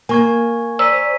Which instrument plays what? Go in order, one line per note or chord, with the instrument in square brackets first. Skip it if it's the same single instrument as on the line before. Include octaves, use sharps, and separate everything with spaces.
[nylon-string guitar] A#3 [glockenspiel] G#5 C#6 G#6
[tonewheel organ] C5 D5 [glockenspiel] A#5 B6 D#7 [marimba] E6